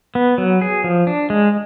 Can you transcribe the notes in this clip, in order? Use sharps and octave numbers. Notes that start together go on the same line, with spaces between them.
B3
F#3
G#4
F3
D4
G#3